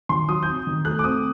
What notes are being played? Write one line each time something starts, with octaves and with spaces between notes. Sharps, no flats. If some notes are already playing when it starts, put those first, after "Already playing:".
D#3 C6
F#3 D#6
C4 G6
D#3
A3 F#6
D6
C4 D#6